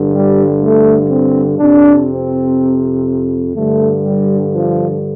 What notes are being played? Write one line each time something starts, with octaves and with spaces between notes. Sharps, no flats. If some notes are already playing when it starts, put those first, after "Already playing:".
Already playing: G2 D3
G3
A3
C4
F2 C3 D4
C4
G2 D3 A3
G3
F3